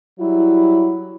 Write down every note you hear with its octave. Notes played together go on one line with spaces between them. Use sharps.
F#3 G3 E4